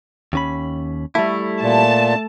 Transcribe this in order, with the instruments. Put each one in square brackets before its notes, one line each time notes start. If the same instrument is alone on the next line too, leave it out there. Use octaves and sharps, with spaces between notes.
[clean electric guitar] D#2 C#4 B5
[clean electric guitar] G3 E4 [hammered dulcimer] A3
[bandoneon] A#2 [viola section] A5